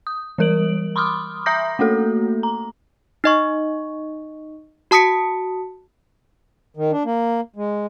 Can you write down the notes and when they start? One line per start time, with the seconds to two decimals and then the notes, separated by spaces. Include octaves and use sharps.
0.07 D#6
0.38 E3 G3 A#4 D7 F#7
0.96 B5 C6 D6 D#6 F6
1.46 E5 A#5 D#6 G6 A#6
1.79 A3 A#3 F#4 A4
2.43 A#5
3.24 D#4 D#5 C#6
4.91 F#4 A5 D#6 B6 C#7
6.77 D#3
6.92 D4
7.05 A#3
7.56 G#3